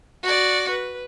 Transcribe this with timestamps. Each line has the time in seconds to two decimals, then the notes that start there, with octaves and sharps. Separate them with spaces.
0.23 F#4 D5
0.70 B4